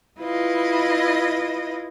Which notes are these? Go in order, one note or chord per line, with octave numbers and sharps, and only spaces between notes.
E4 F4 B4 D#5